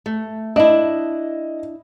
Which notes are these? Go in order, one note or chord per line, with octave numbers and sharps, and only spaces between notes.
A3
D4 E4 D#5